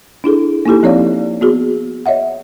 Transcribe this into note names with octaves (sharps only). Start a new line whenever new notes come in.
D4 E4 G#4 A4
A#3 D#4 E4 G4 A4
F3 C4 C#5 D5 F5
B3 F#4 G#4
C#5 D#5 E5 F#5